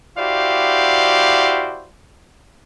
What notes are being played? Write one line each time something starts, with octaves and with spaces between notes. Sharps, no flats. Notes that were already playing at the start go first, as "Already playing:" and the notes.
E4 F#4 G4 C5 D5 F5